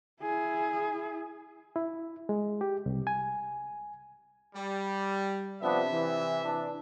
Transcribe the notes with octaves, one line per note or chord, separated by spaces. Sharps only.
E4 G#4
E4
G#3
G4
C2
G#5
G3
C3 F3 B3 D4 E5
E3
E3 D4